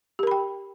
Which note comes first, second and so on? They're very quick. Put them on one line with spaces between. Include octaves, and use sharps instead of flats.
G4 A#4 B5 G5